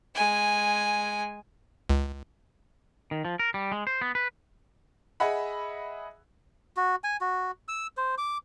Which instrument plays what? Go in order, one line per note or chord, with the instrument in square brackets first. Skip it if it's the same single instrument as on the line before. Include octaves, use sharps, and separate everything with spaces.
[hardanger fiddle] G#3 G#5
[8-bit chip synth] C#2
[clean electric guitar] D#3
F3
A#4
G3
G#3
C5
B3
B4
[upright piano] G#4 D#5 E5 F#5 B5
[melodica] F#4
G#5
F#4
E6
C5
D6